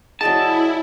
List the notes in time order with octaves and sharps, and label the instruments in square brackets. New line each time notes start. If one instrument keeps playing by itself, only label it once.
[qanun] F#3 D5 D#5 [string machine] E4 [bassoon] G#4 [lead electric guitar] A5